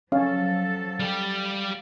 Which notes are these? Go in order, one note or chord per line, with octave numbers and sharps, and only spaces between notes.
F3 F#3 C#4 A4 F5
G3 G4